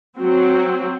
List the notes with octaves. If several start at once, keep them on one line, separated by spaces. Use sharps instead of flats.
F#3 C4 F#4